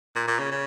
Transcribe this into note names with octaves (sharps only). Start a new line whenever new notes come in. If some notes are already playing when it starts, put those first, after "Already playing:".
A#2
A#2
C#3
C#3